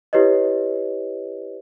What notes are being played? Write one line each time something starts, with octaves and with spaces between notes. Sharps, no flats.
E4 G4 B4 C#5 D#5